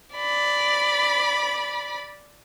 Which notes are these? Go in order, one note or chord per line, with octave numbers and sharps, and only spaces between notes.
D5 B5